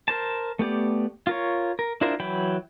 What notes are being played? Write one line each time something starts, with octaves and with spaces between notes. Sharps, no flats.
A#4 C5 A5
A3 B3 G4 D5
F4 A#4 C#5
A#4
D4 E4 F4 A#4 C5
E3 F#3 G5 B5